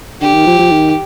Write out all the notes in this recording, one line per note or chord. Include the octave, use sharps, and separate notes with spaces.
D3 G4
D#3
F3
F3
D#3